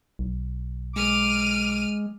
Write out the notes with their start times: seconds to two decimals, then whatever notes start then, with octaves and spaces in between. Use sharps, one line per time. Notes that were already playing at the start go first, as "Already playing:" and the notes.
0.19 B1
0.96 G#3 D6 F6 D#7